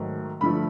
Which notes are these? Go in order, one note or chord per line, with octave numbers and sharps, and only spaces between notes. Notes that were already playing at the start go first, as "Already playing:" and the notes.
Already playing: G#2 D#3 F#3 A3
G2 D3 F3 A3 B5